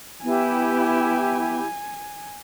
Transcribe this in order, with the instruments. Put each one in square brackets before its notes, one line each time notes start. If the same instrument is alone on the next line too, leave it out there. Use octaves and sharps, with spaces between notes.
[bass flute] B3 [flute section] E4 G4 [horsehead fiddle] G#5